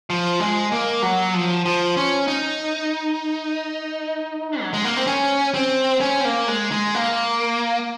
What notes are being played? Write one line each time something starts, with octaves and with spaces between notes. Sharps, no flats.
F3
G#3
A#3
F#3
F3
F3
C#4
D#4
F#3
G#3
A#3
C4
C#4
C4
C#4
C4
A#3
G#3
G#3
A#3